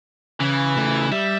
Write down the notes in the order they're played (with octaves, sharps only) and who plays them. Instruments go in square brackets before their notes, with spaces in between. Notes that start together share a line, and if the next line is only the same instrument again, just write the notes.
[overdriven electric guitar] C#3 [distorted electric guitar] E3
[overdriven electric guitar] C#3 A3
[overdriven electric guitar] G3 [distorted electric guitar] E5